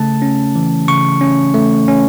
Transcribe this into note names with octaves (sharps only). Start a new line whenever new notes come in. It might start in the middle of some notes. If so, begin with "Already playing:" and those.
Already playing: C#3 A3 A5
C#4
E3
C#3 C#6
C#4
A3
C#4